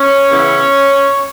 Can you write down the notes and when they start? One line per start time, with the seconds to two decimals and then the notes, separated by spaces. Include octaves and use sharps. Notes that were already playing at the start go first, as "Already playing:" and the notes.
Already playing: C#4 C#5
0.30 C#3 E3 B3 E4